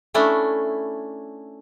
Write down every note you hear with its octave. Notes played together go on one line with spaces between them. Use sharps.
A3 C#4 D4 E4